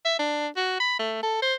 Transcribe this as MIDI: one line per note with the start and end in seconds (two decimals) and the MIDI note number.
0.05 0.17 76
0.19 0.48 62
0.56 0.78 66
0.80 0.99 83
0.99 1.22 57
1.23 1.40 69
1.42 1.54 72